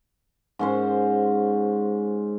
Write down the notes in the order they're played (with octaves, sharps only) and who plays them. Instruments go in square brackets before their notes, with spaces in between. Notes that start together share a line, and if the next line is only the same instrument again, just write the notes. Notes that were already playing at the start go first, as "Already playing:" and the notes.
[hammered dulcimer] G#2 C#4 C5